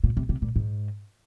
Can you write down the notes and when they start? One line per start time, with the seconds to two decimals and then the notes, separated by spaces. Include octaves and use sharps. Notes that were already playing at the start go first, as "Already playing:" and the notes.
0.04 A#2
0.17 C3
0.29 C3
0.42 A#2
0.56 G#2